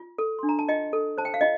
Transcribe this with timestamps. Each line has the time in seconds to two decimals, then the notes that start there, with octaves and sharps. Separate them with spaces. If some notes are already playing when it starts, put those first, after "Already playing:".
Already playing: F4
0.18 A4
0.39 D4 C6
0.49 A#5
0.59 A5
0.68 F4 D#5 G5
0.93 A4
1.18 C5 A5
1.25 G5
1.34 F5
1.41 F4 D#5 G5